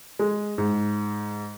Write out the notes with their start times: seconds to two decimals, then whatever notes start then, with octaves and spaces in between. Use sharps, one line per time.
0.19 G#3
0.58 G#2